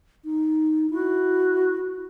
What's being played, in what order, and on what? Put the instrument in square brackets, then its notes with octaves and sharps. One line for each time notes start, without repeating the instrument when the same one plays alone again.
[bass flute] D#4
[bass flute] E4 [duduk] F#4